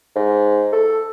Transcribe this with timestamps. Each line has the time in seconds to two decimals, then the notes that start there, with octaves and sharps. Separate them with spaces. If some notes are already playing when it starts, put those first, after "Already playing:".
0.16 G#2
0.72 A4